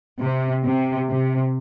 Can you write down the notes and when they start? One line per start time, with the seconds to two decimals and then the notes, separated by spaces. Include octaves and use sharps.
0.21 C3
0.64 C3
1.09 C3